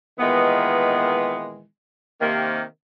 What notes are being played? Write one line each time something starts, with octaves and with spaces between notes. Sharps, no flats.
A#2 D#3 E3 G#3 B3
C3 D#3 A#3